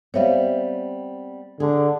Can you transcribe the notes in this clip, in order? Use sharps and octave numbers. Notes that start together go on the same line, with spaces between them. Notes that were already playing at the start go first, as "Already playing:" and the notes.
G3 B3 C4 C#5 E5 F5
D3 G#4